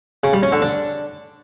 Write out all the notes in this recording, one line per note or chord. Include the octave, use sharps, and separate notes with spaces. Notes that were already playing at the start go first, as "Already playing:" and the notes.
C#3
G3
C#4
D3
D4